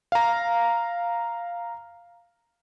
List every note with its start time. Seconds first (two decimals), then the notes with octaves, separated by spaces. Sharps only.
0.12 F5 A#5